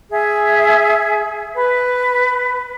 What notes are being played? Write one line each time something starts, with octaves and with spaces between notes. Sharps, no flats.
G#4 E5
B4